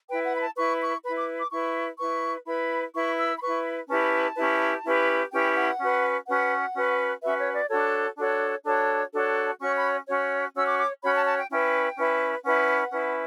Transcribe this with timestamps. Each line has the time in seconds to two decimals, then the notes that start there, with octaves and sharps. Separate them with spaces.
0.09 E4 B4 G5
0.25 F#5
0.35 B5
0.40 A5
0.56 E4 B4 C#6
0.80 C#6
1.04 E4 B4 B5
1.16 D6
1.39 D6
1.51 E4 B4 C#6
1.99 E4 B4 C#6
2.46 E4 B4 B5
2.94 E4 B4 C#6
3.18 E6
3.36 B5
3.41 E4 B4 C#6
3.89 C#4 E4 G4 B4 A5
4.37 C#4 E4 G4 B4
4.84 C#4 E4 G4 B4
5.32 C#4 E4 G4 B4 G5
5.55 F#5
5.79 C#4 F#4 B4
6.26 C#4 F#4 B4 F#5
6.75 C#4 F#4 B4
7.22 C#4 F#4 B4 E5
7.38 C#5
7.54 D5
7.69 D4 F#4 A4 C#5
8.17 D4 F#4 A4 C#5
8.64 D4 F#4 A4 C#5
9.13 D4 F#4 A4 C#5
9.60 C#4 F#4 C#5 C#6
9.75 B5
10.07 C#4 F#4 C#5
10.55 C#4 F#4 C#5 E6
10.66 D6
10.78 D6
11.02 C#4 F#4 C#5 B5
11.15 A5
11.26 A5
11.38 G5
11.50 C#4 E4 B4 G5
11.97 C#4 E4 B4
12.45 C#4 E4 B4 F#5
12.92 C#4 E4 B4